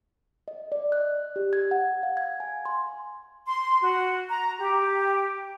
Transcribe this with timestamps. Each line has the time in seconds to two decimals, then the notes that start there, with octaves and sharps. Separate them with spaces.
0.48 D#5
0.72 D5
0.92 F#6
1.36 G4
1.53 G#6
1.71 F#5
2.03 F5
2.17 G#6
2.40 G#5
2.65 C6
3.47 C6
3.82 F#4
4.29 A#5
4.59 G4